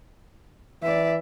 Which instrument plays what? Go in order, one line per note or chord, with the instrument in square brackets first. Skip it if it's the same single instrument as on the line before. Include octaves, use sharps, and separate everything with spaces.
[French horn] E3 [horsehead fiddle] D5 E5